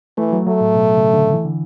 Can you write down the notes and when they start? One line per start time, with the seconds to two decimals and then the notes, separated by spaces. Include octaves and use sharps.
0.18 E3 A3
0.33 F#3
0.47 F#3 A3
0.61 A2
0.75 B2
0.95 C#3
1.14 D3
1.33 E3
1.45 D3